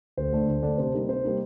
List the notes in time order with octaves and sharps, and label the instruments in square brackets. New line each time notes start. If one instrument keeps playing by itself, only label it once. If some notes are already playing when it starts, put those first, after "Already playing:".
[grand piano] D2 C5
D3 A3 D4
D2
D3 A3 D4
C3 C5
G3 A#3 D#4
C3 C5
G3 A#3 D#4